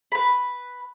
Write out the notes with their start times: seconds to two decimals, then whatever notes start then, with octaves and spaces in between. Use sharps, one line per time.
0.12 B4 B5